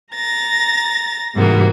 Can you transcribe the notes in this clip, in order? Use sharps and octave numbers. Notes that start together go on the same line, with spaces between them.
A#5 A6 A#6
G#2 C3 E3 G3 A#3 F#4